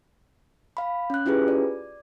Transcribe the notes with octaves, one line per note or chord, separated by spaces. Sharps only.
F5 B5
C#4 F#6
C#4 E4 F4 G4 G#4 B4
D5